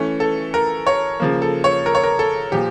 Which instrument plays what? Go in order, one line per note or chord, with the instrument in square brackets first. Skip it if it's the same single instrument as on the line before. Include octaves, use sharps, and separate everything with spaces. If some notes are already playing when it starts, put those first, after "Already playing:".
Already playing: [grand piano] E3 A3 C#4
A4
A#4
C#5
C#3 F3 A#3
A4
C#5
A#4
C#5
A#4
A4
A#2 F3 G4